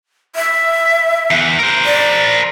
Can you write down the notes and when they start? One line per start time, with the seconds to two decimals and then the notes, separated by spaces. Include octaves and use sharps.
0.36 E5
1.31 E2 E3
1.59 A#4 C5
1.85 D5